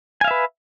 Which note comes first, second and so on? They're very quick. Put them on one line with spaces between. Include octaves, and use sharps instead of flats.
G#5 F5 E5 B4